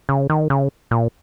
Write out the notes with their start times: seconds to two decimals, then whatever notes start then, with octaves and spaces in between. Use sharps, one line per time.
0.09 C#3
0.30 D#3
0.50 C#3
0.91 A#2